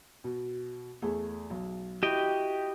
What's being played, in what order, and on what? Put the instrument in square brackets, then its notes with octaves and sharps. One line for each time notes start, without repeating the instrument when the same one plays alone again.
[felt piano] B2
E2 A3 G#4
B1
[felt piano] E4 F#4 [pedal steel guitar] G4 D#5 G5